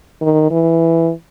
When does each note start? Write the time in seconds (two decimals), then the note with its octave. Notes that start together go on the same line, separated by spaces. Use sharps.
0.21 D#3
0.50 E3